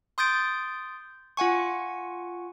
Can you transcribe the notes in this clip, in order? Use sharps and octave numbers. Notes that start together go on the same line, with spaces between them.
C6 D#6 G6 A6 D7
F4 F#5 G#5 C#6